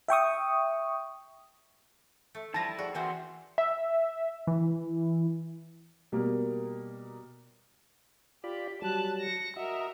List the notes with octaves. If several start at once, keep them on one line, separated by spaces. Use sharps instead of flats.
E5 G5 C#6 D#6
A3
F3 G3 E4 F4 A5 A#6
F#4 G#4 D5 G5
E3 A#3 C4 F#4 C5 G#5
E5
E3
B2 G3 A#3 A#4
F4 G4 D5 B5
F#3 G3 A5 F#6
A#6 C#7
F#4 A#4 D#5 E5